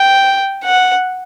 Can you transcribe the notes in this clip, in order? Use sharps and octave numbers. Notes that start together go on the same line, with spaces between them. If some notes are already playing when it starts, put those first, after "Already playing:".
Already playing: G5
F#5